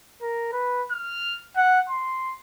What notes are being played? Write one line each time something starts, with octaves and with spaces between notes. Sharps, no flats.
A#4
B4
F6
F#5
C6